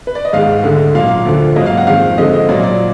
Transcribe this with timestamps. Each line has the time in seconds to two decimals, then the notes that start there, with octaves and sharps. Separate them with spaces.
0.07 B4
0.15 D5
0.25 D#5
0.33 G#2 D#3 G#3 F5
0.64 D2 D3 G#3
0.95 A#2 F#3 A#3 F5
1.25 D2 D3 F3
1.56 G#2 F#3 A#3 D#5
1.66 F5
1.77 F#5
1.87 F2 D#3 G#3 F5
2.18 F2 D3 G#3 D#5
2.33 D#5
2.49 A#2 F#3 A#3 D5
2.64 D5